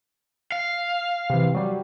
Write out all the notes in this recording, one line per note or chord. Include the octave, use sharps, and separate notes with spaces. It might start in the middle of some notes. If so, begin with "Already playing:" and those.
F5
C3 E3
F#3 G3